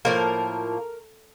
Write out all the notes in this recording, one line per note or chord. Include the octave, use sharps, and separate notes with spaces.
A2 F3 A#3 A#4